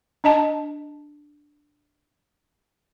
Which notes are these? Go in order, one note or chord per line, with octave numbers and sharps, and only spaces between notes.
D4 D#5 A5